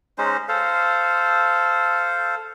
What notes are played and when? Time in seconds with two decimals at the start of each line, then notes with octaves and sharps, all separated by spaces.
0.18 G#3 C#4 D#4 C5
0.49 A4 C5 F5